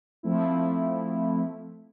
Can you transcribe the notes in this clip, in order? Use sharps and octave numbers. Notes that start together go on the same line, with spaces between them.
F3 A3 C4 E4